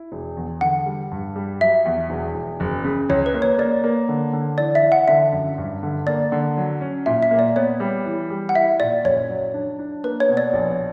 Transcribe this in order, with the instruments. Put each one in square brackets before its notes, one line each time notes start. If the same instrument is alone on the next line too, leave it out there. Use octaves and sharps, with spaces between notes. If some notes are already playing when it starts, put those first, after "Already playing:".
Already playing: [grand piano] E4
E1
E2
[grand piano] D3 [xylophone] F#5
[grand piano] G3
G2
G3
[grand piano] F#3 [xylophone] E5
[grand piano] E2
E1
E1
F#1
C#3
[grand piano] C#2 [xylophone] C#5
[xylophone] B4
[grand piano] A#3
[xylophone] C#5
[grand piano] A#3 [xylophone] D5
[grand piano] A#3
D3
D3
[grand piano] E3 [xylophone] D5
[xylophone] E5
[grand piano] E3
[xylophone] F#5
[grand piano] D3 [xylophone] E5
[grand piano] F#2
G2
D3
[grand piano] A#3 [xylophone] D5
[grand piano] D3
F#3
C#4
[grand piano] A#2 [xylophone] E5
[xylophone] E5
[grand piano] A#3
[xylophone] D5
[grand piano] B3 [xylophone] C#5
[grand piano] G3
E3
G3
[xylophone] F#5
[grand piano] E4 [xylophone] E5
[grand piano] A#2 [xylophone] D5
[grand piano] F#1 [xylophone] C#5
[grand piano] F#3
D4
D4
[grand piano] A#3 [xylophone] B4
[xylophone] C#5
[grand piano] B2
[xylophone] D5
[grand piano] A#1